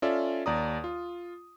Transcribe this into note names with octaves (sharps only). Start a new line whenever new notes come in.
C#4 F4 A4 D5 E5
D#2 D5 A#5 D#6
F4